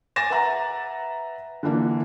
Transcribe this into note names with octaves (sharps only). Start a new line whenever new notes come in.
G#5 D6 A6 A#6 E7
B4 E5 F#5 A#5
D3 E3 A#3 D4